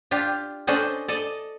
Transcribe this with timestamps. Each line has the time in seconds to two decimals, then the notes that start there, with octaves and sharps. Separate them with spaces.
0.11 D4 F4 G4
0.67 C#4 D4 A4 C5 D5 D#5
1.08 A4 D5 D#5